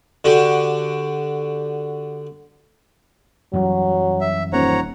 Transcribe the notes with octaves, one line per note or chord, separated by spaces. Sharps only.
D3 F#4 G4
F#2 E3 F#3 G3
E5
D#1 C5 C#5 F#5 A#5